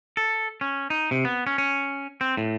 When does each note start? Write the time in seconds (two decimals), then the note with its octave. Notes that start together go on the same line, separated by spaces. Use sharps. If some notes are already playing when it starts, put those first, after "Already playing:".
0.17 A4
0.61 C#4
0.90 D#4
1.11 C3
1.25 B3
1.47 C#4
1.58 C#4
2.21 C4
2.37 A2